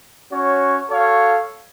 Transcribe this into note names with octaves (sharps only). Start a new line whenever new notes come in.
C#4 F#4 C#5
F#4 A4 C#5 F5